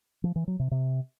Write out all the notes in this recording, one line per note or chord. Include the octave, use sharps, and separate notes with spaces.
F3
E3
F#3
C3
C3